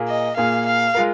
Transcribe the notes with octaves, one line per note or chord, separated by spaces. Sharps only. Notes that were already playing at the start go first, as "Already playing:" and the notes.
Already playing: A#2 A#3 G#4
D#5
A#2 A#3 G#4 F5
F5
G#3 F4 A#4